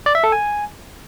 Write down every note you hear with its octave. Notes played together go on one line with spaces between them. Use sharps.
D5
E5
A4
G#5